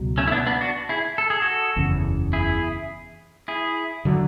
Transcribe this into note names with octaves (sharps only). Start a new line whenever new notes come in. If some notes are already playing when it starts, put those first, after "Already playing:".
Already playing: C#2 B2 F#3
A3 C#4
E4
B3 D4
B3 D4
D4 F#4
E4 G#4
A4
G#4
F#4 A4
F#1 E2 C#3
E4 G#4
E4 G#4
D3 F#3